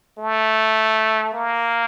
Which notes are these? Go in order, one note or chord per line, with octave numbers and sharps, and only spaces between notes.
A3
A#3